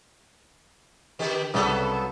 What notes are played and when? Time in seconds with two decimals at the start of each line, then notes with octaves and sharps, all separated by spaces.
1.19 D3 G4
1.54 C2 C#3 F#3 B3 A4 D#6